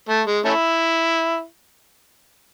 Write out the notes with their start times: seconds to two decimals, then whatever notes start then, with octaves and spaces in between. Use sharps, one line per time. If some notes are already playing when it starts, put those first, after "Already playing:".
0.09 A3
0.26 G#3
0.45 A3 C#4 E4